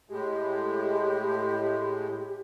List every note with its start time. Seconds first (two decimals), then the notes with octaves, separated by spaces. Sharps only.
0.10 A2 G#3 G4